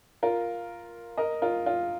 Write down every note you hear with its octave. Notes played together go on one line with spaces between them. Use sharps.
F4 A#4
A#4 D#5
F4 A#4
F4